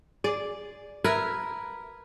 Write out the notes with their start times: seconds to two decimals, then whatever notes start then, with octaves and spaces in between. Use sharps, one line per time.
0.24 G#4 D5
1.04 A#4 B4 E5 G#6